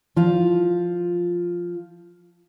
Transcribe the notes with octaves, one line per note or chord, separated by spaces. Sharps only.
F3 F4